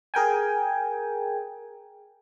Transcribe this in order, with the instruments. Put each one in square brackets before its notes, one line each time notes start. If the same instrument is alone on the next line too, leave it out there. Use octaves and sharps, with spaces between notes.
[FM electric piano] G#4 A#4 G5 G#5